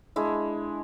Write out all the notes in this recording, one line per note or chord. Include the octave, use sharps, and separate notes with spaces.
G#3 D4 E4